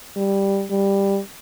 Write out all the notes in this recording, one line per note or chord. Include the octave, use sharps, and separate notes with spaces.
G3
G3